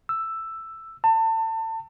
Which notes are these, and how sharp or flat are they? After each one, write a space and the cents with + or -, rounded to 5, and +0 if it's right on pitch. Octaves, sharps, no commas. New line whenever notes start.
E6 +5
A5 +30